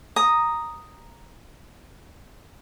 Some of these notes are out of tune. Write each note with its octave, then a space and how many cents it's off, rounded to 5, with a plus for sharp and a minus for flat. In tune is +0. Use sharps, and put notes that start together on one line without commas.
A#5 +0 D#6 +0